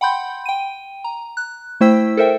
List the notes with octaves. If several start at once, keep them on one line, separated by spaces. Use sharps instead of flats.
F#5 G5 B5 C6 G6
G5 D#7
A#5
F#6
A3 E4 C5 G5 E6 B6
A4 A#4 C5 E5 G5